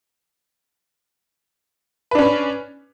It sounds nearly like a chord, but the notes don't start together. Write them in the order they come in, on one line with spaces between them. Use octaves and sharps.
B4 D4 C#4